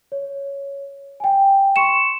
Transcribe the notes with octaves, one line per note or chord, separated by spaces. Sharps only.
C#5
G5 G#5
C6 C#6 C#7 E7